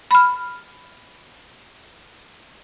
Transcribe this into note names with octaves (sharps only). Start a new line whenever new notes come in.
B5 F6